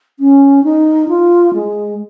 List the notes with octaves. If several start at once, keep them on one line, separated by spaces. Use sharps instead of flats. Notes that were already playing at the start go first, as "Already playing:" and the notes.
C#4
D#4
F4
G#3